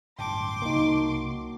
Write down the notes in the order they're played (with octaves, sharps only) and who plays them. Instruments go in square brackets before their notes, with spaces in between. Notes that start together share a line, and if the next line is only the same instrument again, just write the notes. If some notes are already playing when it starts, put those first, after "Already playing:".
[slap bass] D1 G2 G3 [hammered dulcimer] G5 A5 [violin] C6 D6
[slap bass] C2 C#3 [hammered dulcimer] F#3 [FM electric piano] A#3 D#4